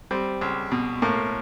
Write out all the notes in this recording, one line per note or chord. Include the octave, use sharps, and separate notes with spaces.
G3 C4
C#2
B2
A2 A#3